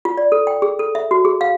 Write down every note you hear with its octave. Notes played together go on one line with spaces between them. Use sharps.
F4
D5
A4
G5
G#4
A4
E5
F#4
G#4
F5